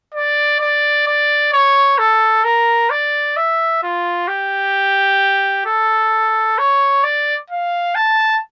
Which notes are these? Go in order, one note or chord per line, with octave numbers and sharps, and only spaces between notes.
D5
D5
D5
C#5
A4
A#4
D5
E5
F4
G4
A4
C#5
D5
F5
A5